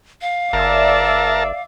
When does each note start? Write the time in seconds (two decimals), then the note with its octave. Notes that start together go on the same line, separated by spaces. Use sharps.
0.22 F5
0.53 F#1 A#4 D5 E5 A5